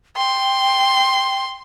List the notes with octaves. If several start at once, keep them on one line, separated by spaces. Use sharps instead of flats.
G5 C6